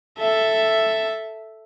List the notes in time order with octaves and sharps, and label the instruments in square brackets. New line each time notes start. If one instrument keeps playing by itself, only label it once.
[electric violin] A4 E5